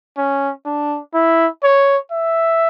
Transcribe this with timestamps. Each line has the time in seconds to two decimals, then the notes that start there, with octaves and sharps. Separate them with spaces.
0.17 C#4
0.66 D4
1.14 E4
1.63 C#5
2.11 E5